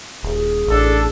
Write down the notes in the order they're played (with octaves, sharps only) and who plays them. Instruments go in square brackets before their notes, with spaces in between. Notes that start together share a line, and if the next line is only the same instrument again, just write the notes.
[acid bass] D#1 [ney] G#4
[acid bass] A1 [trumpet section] D4 A4